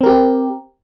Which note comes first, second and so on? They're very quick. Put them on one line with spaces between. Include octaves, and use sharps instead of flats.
C4 A#4 G4